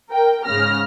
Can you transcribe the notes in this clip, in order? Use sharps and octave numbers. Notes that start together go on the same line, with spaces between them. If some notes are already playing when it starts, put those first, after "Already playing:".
A#4 G5
G#2 C#3 F6 A#6